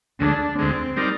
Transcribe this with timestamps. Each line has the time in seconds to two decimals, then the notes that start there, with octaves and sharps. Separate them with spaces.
0.20 D2 D3 G#3 D4
0.58 D2 D3 G#3 C4
0.96 G3 C4 D#4 A#4 D5